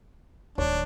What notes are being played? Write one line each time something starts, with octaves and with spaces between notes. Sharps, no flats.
D1 D#3 D4 C#5